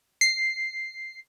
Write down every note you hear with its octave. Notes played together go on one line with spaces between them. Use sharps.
C7